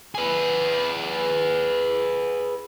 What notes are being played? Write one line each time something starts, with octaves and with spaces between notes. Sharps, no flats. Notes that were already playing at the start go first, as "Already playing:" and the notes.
G#4 B4